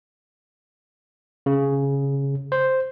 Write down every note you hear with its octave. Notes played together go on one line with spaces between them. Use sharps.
C#3
C5